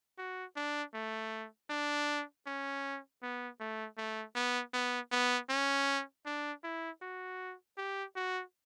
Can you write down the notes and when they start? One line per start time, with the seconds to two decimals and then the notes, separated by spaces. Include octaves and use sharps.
0.18 F#4
0.56 D4
0.94 A3
1.70 D4
2.47 C#4
3.22 B3
3.60 A3
3.98 A3
4.35 B3
4.74 B3
5.12 B3
5.50 C#4
6.26 D4
6.64 E4
7.02 F#4
7.78 G4
8.16 F#4